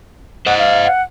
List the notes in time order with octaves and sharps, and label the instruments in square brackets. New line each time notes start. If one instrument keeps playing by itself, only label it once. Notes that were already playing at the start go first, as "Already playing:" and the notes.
[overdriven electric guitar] C5 D#5 [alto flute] F#5
[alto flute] F5
[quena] F#5